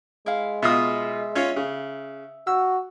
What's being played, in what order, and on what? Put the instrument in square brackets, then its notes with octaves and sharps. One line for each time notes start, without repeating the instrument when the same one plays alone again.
[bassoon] G#3 [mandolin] E4 F5
[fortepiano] B2 F4 D#6 [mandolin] E5
[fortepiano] C#4 F4 C#5
C#3
[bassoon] F#4 [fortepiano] E6